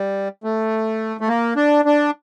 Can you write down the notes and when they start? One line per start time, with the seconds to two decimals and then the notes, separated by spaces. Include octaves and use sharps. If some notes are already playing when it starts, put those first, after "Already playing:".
Already playing: G3
0.44 A3
1.21 A3
1.28 A#3
1.56 D4
1.85 D4